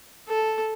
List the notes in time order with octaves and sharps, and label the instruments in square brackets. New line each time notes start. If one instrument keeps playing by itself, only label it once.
[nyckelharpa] A4